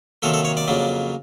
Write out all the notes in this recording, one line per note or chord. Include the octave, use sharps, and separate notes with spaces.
C3 D#3 F#3 A#3 A4
A4
C#5
D5
F2 C#3 F#3 A#3